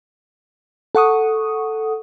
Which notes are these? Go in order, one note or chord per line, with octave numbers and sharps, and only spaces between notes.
A4 F#5 C#6 D#6